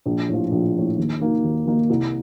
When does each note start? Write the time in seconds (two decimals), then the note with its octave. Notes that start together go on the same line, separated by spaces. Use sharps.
0.06 A#1
0.29 A2 F3
0.51 A#1
0.75 A2 F3
0.98 D#2
1.20 D#3 A#3 D#4
1.44 D#2
1.66 D#3 A#3 D#4
1.90 C2